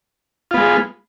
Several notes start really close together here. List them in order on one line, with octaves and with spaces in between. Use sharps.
F4 B3 G#3